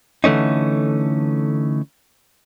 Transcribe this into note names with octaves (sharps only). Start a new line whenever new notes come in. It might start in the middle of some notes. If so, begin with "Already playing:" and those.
D3 E3 A3 C#4 D#4